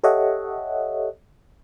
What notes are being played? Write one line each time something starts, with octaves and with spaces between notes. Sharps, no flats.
G4 A4 C#5 D#5 E5 F#5